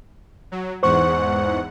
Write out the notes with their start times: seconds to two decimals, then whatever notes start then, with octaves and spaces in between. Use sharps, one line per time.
0.52 F#3
0.83 E2 G#2 C5 F#5 C#6